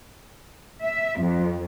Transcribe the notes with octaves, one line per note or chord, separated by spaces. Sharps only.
E5
F2